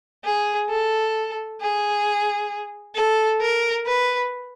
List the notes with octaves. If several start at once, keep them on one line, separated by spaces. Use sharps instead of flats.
G#4
A4
G#4
A4
A#4
B4